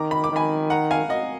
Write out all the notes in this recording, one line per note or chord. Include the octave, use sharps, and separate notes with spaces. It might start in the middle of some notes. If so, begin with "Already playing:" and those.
Already playing: D#3 A#5 D6
B5
D6
D#3 G#5 B5
F#5 A#5
F5 G#5
D#5 F#5